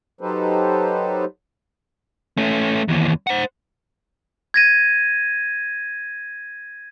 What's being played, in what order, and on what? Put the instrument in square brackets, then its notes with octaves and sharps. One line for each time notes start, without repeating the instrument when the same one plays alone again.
[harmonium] F#3 D#4 G4 A4 B4 C5
[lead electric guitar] A3 C#4
D#2 E3
C5 F#5
[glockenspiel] G#6 A#6 D#7